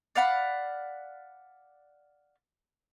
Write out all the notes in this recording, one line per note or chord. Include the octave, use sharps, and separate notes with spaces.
D5 F5 F#5 B5